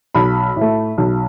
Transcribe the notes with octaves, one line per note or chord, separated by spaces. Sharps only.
B1 B5
A2 A3
B1